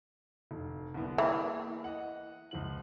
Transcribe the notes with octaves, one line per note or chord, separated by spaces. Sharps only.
F1
C2 D3 B3
E3 A#3 G#4 E5
D#5 F#5
C#2 F3 F#7